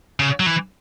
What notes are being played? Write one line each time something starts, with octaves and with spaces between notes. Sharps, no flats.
C#3
F#3
E3